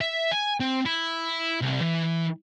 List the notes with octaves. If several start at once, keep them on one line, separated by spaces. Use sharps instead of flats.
E5
G#5
C4
E4
C2
E3